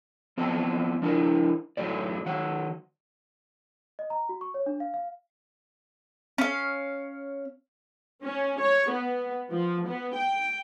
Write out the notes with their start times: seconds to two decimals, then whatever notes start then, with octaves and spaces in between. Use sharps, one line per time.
0.38 F3 B3 C4 D#5 A5
1.02 F3 D4 E4 A#4
1.77 F#2 A2 C3 F#3 A3 D5
2.26 D#3 F#3 F#5
3.99 D#5
4.10 A#5
4.29 F#4
4.41 C#6
4.54 C#5
4.66 D4
4.80 F5
4.94 F5
6.38 C#4 F5
8.24 C#4
8.60 C#5
8.91 B3
9.52 F3
9.88 B3
10.16 G5